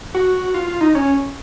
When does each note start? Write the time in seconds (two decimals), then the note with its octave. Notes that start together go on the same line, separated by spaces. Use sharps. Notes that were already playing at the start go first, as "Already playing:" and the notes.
0.15 F#4
0.54 F4
0.67 F4
0.81 D#4
0.95 C#4